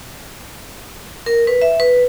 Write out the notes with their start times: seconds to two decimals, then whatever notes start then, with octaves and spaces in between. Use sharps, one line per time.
1.26 A#4
1.47 B4
1.62 E5
1.80 B4